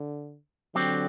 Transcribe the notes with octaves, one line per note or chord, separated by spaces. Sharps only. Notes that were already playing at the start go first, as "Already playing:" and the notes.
Already playing: D3
D3 F#3 C4 G4